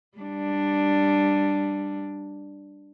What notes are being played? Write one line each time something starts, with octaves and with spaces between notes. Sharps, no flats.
G3 D4